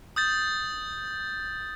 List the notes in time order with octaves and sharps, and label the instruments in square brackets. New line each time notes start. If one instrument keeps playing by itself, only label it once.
[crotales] D#6 G6 A6